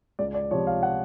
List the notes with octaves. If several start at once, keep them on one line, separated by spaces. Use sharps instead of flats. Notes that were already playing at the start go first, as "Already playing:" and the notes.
C#2 D5
D5
C3 F3 C#5
F5
F#5